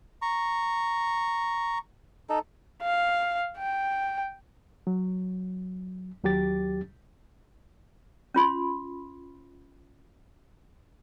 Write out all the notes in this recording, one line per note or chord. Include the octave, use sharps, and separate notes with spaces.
A#5 C#6
D#4 A4
F5
G5
F#3
D#2 F#3 G4 A6
C#4 F4 B5 C6